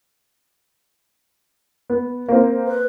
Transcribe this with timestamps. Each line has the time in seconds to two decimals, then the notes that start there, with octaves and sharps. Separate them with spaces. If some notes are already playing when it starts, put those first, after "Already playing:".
1.90 B3
2.28 A#3 C4
2.67 B4